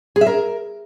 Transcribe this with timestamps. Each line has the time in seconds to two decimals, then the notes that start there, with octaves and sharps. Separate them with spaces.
0.16 G#4
0.21 E5
0.26 A#4